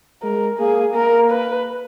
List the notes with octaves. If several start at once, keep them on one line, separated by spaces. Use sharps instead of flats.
G#3 A#4
A#3 G#4
A#3 A#4
B4